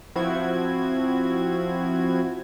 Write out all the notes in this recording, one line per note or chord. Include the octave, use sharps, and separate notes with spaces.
F3 C4 E4 F#4 G#6